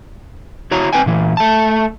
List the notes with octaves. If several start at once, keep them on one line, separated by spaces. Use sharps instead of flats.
E4 F#4 C#5 A#5
C4 B4 G5 G#5
A#2 E3
A3 A5